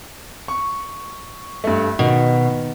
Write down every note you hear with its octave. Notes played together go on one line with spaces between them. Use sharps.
C#6
G2 A3
B2 D#3